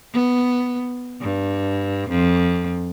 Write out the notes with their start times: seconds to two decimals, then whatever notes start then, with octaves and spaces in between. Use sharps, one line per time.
0.13 B3
1.21 G2
2.10 F2